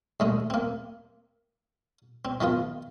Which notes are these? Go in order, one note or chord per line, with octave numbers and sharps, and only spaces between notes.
D#2 G#3 A3
A#3 C4
C4
D#3 F3 B3 F4